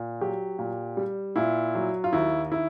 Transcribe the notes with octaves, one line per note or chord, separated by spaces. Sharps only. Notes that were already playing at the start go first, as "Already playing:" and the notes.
Already playing: A#2
F#3 G4
A#2
G3
A#2 E4
F#3
F4
D#2 E4
D#3 E4